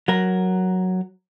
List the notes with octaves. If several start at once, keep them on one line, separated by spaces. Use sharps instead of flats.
F#3 A#4